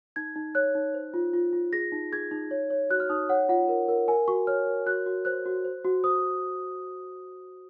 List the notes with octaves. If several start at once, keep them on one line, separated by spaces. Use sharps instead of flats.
D#4 G#6
D#4
C#5 F#6
D#4
C5
F4
F4
F4
G#4 A#6
D#4
G#4 G#6
D#4
C#5
C#5
F#4 F#6
F6
D#4 D#6
C#5 F#5
F4 F#5
A#4
A#4
A#4 G#5
F#4 C#6
C#5 F6
A#4
F#4 F#6
F#4
C5 F#6
F#4
C5
F#4
C5 D#6